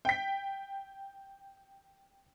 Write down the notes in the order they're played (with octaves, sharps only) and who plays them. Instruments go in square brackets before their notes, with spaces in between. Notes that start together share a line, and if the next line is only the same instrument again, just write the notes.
[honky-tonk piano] G5 B6